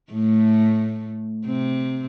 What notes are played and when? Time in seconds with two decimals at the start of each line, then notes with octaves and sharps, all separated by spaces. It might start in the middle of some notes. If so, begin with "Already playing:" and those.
0.12 A2 A3
1.46 C3 C4